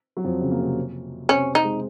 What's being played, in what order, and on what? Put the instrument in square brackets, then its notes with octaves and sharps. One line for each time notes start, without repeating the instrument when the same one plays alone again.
[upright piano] F#3
F2 F3
C#3
A#3
C3 C4
[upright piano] C3 C4 [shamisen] C#4
[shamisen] D#4
[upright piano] G#3